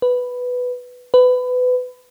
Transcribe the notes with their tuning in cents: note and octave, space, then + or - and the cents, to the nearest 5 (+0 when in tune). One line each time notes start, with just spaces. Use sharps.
B4 +5
B4 +25